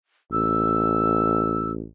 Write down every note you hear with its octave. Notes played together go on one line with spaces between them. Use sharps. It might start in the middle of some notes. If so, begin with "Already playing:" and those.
A1 E6